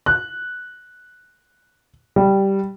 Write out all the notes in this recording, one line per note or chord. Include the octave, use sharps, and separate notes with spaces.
F#6
G3